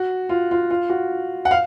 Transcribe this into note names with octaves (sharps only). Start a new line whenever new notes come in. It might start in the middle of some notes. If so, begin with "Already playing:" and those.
Already playing: F#4
F4
F4
F4
F#4
F#5
F5